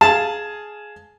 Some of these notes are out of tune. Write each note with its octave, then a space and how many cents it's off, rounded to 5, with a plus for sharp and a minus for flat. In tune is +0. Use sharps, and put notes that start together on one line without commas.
G#4 +10 F5 +0 A5 +0